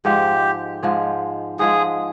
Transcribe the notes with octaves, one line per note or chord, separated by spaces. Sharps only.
G#2 F3 G#3 G4
G#2 F3 G#3
G#2 F3 G#3 G#4